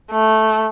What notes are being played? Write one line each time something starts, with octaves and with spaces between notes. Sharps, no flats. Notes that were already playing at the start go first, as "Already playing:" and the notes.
A3